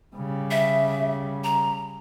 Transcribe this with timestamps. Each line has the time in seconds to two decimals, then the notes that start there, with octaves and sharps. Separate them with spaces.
0.16 C#3 G3
0.51 E5
1.44 A#5